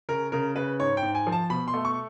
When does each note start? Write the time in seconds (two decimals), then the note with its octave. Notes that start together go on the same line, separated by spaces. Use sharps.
0.09 C#3 A#4
0.32 C#3 A#4
0.56 C#3 B4
0.79 G#2 C#5
0.97 G5
1.02 G#2
1.15 G#5
1.27 F3
1.32 A5
1.50 B2 B5
1.68 C6
1.74 A3
1.85 C#6